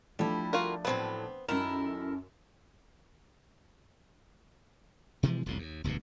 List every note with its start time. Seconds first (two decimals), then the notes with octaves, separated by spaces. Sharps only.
0.19 F3 G3 A3 D4 E4
0.53 F4 F#4 A#4
0.85 A2 C3 F#3 B3 C4
1.49 F#2 D#3 E4 A4 A#4 E7
5.23 B2 E3 F3 G#3
5.46 E1 C2 F2 A2
5.58 D#2
5.84 E1 D2 G2 B2